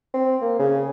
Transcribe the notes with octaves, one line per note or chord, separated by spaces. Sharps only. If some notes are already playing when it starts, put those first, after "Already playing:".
C4
A#3
C#3